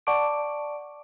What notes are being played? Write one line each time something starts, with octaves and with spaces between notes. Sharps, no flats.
D5 F#5 A5 C#6 D6 D7